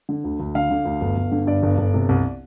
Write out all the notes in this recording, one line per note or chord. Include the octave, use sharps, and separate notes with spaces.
D3
D2
D2
D3 F5
D3
D2
G1
G1
D3
G2 D5
G1
G1
C3
C2